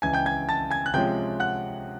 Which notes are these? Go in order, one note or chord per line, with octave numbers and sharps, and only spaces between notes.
C#2 C#3 E3 G#5 G#6
G5 G6
G#5 G#6
A5 A6
G#5 G#6
F#6
C3 F3 G#3 C#4 F4 G5 G6
F#5 F#6